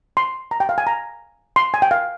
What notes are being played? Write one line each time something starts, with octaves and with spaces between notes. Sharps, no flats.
C6
A#5
G5
F5
G#5
A#5
C6
G#5
G5
F5